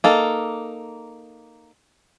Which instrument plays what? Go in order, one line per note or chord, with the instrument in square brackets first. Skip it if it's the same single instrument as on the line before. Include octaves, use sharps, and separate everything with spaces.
[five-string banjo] A#3 D#4 A4